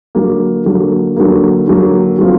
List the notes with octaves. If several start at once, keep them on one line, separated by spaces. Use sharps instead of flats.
D3 F#3 A#3
D3 F#3 A#3
D3 F#3 A#3
D3 F#3 A#3
F#3 A3 C4 F4